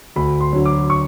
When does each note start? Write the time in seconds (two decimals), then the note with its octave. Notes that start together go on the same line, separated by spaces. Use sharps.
0.16 D2 B5
0.40 C6
0.53 D3 F#3
0.66 D6
0.90 C#6